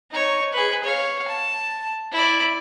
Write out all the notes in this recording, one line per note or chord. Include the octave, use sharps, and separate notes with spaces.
D#4 C#5
G#4 B4
C#5 F5
A5
E4 D5